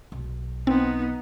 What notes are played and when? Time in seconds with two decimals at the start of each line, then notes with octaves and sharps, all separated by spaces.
0.12 B1
0.67 B3 C4 D#4